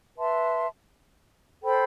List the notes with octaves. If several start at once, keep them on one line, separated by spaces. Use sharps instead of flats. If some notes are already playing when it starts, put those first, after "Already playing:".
B4 E5 A5 C6
A4 C5 G5 B5